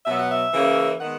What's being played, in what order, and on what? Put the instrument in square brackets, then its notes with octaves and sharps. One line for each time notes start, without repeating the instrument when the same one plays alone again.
[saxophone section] B2 F#3 B3 E5
F#5
E5
C#3 E3 A#3 C#4
D#3 G#3 B3 F#5